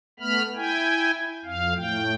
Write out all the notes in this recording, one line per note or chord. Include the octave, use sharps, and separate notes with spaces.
A3 B3 B5 F6
E4 G5 G#5
F2 F5
A2 G5